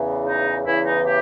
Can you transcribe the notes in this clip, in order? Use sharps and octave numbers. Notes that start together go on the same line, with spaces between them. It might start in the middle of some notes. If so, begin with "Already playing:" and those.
Already playing: E2 C#3 E3
D#4
E2 C#3 E3 E4
D#4
G4